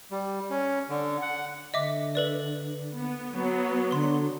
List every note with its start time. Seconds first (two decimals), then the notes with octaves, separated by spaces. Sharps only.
0.11 G3
0.50 C#4
0.89 D3
1.22 F#5
1.74 D3 D#5 E5 D6
2.15 A4 B4 D5
2.95 B3
3.33 F#3 B3
3.91 D3 C6 G7